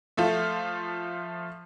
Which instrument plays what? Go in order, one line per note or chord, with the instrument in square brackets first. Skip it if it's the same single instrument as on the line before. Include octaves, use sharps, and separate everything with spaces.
[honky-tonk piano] F3 A3 F4 A4